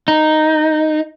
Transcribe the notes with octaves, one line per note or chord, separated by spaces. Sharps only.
D#4